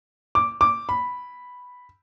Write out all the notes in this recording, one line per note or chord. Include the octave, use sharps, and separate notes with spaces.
D6
D6
B5